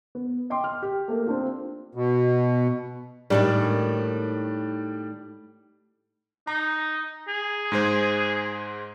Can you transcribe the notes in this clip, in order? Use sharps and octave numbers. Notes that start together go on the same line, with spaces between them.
B3
D#5 G5 C6 D6
F6
G4
A3 A#3
C4 D4 F4
B2
A2 D#3 G3 G#3 D4
D#4 A#5
G#4
G#2 G#3 C5